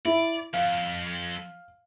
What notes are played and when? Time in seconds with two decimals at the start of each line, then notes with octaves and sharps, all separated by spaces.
0.05 E4 D5
0.53 F2 F5